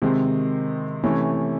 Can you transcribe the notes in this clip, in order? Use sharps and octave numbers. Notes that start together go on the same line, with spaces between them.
C3 D#3 G#3 C4
C3 E3 A3 C#4